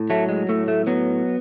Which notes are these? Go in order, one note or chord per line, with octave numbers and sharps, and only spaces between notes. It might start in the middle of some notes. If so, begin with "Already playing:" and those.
Already playing: A2
F#3 A3
G#3
A2 A3
A3
F#3 B3